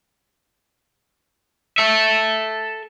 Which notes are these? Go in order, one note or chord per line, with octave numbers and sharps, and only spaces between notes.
A4 E5